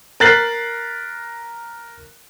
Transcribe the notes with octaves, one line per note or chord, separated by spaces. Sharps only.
A#4 F#6 A6 B6 C7 F#7